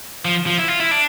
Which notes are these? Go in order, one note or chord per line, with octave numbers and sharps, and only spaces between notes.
F3
F3
E4
F4
E4
D4